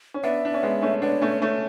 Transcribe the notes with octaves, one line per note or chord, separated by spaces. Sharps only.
C#4
B3 D4 E5
D4
C#4
G#3 B3
A3 C#4
B3 D4 C#5
A3 C#4
A3 C#4